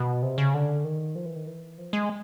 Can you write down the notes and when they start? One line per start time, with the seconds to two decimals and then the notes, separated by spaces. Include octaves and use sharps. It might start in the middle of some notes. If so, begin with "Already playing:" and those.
Already playing: B2
0.23 C3
0.38 C#3
0.54 D3
0.84 D#3
1.15 F3
1.25 E3
1.36 D#3
1.46 E3
1.78 F3
1.93 G#3